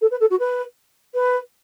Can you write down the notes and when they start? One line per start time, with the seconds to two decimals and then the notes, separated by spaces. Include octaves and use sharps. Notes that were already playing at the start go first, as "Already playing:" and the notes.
0.01 A4
0.11 B4
0.20 A4
0.30 F#4
0.39 B4
1.14 B4